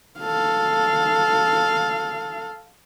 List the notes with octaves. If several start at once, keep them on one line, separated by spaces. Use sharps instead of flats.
A4 F5